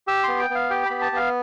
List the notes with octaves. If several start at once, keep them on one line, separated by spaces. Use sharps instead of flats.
G4 E6
B3 C6
G5
B3 F5
G4 G5
B3 B5
A5
B3 F5